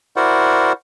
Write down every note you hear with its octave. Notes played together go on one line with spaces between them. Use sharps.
E4 F#4 A#4 C5 D5 F#5